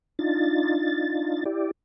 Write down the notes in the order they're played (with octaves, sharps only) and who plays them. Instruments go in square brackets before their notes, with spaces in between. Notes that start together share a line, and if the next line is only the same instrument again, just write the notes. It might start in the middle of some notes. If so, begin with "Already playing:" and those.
[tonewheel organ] D4 D#4 F4 A6
E4 G4 D5